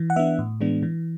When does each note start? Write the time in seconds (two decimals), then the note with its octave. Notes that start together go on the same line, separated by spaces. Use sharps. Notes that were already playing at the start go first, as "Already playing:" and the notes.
Already playing: E3
0.10 F#5
0.16 B3 D4 E5
0.39 A2
0.61 E3 G#3 B3 D4
0.83 E3